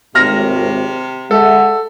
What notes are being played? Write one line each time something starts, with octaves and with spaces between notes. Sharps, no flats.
G#1 D#2 A2 C3 F6 A#6
G#3 A4 E5 F#5